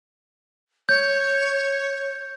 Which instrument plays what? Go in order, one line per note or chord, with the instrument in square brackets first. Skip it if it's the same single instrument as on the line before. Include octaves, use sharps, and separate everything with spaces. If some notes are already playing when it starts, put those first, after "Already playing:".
[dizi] C#5 [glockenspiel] G6